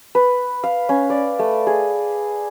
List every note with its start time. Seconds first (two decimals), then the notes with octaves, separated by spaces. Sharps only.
0.15 B4
0.64 F5
0.89 C#4
1.10 D5
1.39 A3
1.67 G#4